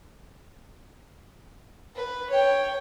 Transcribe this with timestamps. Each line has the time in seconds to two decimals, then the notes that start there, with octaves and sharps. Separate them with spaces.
1.95 B4
2.30 C#5 G5